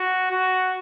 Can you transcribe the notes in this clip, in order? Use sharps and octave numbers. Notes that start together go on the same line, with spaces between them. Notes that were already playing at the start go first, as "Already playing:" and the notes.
Already playing: F#4
F#4